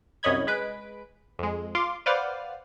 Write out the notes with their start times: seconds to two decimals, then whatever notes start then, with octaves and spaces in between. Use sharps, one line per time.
0.23 C2 F#2 C#5 D#5 B5 G#6
0.47 G#3 B4 D7
1.39 F2 G#3
1.75 F4 C6 D6
2.06 B4 C5 D5 F5 F#5